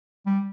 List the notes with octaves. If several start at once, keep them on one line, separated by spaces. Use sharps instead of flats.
G3